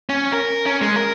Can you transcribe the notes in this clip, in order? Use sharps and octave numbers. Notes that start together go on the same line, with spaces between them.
C#4
A#4
C#4
G#3
A#4